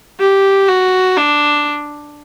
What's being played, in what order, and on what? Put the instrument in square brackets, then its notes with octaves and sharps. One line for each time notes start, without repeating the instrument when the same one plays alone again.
[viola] G4
F#4
D4